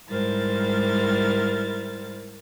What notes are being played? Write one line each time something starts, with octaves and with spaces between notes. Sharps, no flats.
G#2 G3 E4 A#4 C5 A6